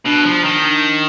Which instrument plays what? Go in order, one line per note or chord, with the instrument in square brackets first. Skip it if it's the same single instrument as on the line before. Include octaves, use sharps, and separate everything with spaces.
[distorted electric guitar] B2 [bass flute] D4
[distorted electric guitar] F3
D#3